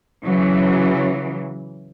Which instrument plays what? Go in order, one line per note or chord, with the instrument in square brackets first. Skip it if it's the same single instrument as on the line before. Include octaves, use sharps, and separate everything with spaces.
[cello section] C#3 E3 F#3